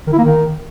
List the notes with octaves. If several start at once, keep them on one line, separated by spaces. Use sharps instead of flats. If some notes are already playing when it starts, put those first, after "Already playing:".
D#3
E4
A#3
D#3